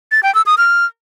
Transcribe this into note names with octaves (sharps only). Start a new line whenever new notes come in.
A6
G5
E6
D#6
F6